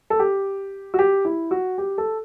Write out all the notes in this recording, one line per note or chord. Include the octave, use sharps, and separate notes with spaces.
A4
G4
F#4
G4
E4
F#4
G4
A4